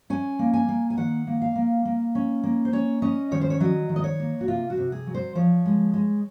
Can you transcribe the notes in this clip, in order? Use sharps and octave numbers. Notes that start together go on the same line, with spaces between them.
C#4 G#5
A#3
G#5
A#3
G#5
D#3 F#5
A#3
F5
A#3
A#3
C#4
A#3
C5
C#4 C#5
C#4 D#5
D#3 C#5
C5
C#5
F#3 D#5
D#3
D#5
C#5
A#3
F#4
C3 F4
F#4
C3
G#4
F#3
C5
F3 C#5
G#3
G#3